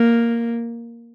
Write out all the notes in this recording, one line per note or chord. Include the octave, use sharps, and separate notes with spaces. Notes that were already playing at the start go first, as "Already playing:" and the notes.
Already playing: A#3